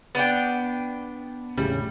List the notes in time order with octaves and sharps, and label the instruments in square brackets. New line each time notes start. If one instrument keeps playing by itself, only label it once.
[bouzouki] B3 D4 G5
[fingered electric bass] E1 A2 C#3 [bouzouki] G3